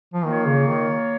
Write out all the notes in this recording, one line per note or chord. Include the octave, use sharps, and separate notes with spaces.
F3
D#3 A#3 F4 C#5
C#3
D#3